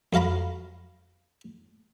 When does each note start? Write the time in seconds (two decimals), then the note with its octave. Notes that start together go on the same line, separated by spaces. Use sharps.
0.13 F2 F#4 F5 A#5 B5